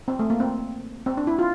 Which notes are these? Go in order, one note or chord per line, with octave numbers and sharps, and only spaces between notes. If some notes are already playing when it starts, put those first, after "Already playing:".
C4
A3
A#3
C4
C4
D4
E4
F4